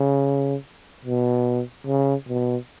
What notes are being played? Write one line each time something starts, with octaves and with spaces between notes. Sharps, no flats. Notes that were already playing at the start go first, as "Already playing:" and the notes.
Already playing: C#3
B2
C#3
B2